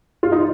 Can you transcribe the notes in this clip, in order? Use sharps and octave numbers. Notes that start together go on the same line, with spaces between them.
F4
D#4